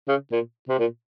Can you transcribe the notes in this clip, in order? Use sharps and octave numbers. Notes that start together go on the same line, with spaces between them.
C#3
A#2
C3
A#2